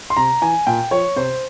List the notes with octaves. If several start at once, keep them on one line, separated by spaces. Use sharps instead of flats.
C6
C3 A#5
E3 G#5
A#2 G5
F3 C#5
C3 C5